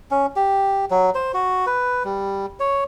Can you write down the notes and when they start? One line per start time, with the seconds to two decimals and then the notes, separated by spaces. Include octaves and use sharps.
0.11 C#4
0.36 G4
0.91 F#3
1.15 C5
1.34 F#4
1.66 B4
2.04 G3
2.60 C#5